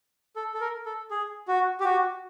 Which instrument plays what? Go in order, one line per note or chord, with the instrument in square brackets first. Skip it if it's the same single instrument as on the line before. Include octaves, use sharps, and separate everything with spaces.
[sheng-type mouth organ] A4
A4
A#4
A4
G#4
F#4
G4
F#4